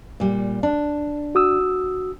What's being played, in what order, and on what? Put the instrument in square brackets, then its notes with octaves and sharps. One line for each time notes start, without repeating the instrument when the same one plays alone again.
[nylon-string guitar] A#2 G3
D4
[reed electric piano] F#4 D#6 E6